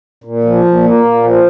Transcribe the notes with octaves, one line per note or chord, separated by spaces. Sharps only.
A#2
F3
A#2
A#3
A#2
F3